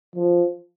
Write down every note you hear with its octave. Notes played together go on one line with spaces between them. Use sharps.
F3